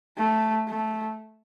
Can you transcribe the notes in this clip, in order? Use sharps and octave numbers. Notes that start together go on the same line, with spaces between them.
A3
A3